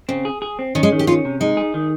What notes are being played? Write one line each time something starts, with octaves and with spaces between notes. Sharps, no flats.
C#3 C4
G#4
G#4
C4
D#3 C#4
G#3
D#3
G4
C#4 F4
C3
G#3 D#4
G#4
D#3